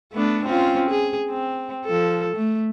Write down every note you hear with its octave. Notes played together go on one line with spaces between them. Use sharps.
A3 B3 D4
C4 C#4 F4
G#4
C4
F3 A4
A3